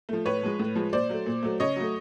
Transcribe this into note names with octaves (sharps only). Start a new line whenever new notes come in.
F3 A3
A2 B4 C#5
F3 G#3
A2
F3 G#3
A#2 C5 D5
F#3 A3
A#2
F#3 A3
C#3 C#5 D#5
F#3 A3